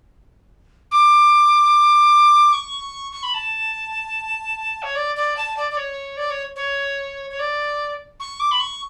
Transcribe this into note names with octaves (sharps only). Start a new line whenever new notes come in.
D6
C#6
C#6
B5
A5
C#5
D5
D5
A5
D5
D5
C#5
D5
C#5
C#5
C#5
D5
C#6
D6
B5
C#6